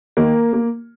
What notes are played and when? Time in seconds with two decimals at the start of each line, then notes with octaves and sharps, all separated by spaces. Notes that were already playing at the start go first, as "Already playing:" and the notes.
0.17 D#3 A#3
0.53 A#3